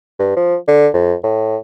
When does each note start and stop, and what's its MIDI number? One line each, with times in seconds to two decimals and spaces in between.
0.19 0.32 43
0.36 0.56 53
0.68 0.88 50
0.94 1.14 41
1.23 1.56 45